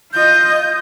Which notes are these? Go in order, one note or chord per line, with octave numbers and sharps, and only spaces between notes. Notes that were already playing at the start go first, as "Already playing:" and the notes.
F4 D#5 G6